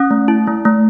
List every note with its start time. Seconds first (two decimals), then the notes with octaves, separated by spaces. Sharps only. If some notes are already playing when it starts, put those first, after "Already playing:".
Already playing: C#4 D#6
0.11 A3
0.28 E4
0.47 A3
0.65 A3